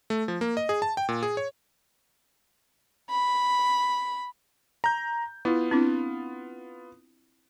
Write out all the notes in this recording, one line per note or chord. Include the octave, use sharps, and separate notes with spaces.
A3
F3
A#3
D#5
G#4
A5
G5
A#2
G#4
C#5
B5
A#5 G6
B3 E4 F4
C4 D4 E4